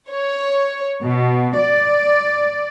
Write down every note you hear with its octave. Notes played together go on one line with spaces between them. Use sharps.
C#5
B2
D5